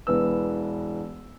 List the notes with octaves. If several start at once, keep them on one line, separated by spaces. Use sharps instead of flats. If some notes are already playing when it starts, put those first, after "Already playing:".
E1 E3 B3 E6